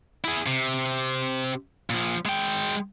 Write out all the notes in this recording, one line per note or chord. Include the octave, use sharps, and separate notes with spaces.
E4 G#4
C3
A#2 F3
G#3 G5